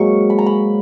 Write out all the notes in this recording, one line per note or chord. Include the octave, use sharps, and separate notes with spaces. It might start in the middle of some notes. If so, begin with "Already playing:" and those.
Already playing: G#2 F#3 A#3 C#6
B5
A#5
B5